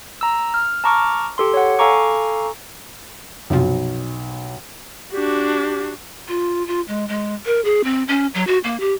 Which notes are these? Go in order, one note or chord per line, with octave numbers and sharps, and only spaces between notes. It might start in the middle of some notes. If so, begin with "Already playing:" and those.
A#5 E6
F6
A5 A#5 C#6 D6 F6
G4 A4 C6
C#5 F#5
A4 F5 G#5 A#5 C#6 D6
B1 F#2 C3 F3
D4 F#4 G4
F4
F4
G#3
G#3
A#4
G#4
C4
C#4
F#3
F#4
A#3
G4